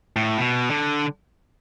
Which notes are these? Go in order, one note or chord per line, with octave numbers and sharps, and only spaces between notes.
A2
B2
D3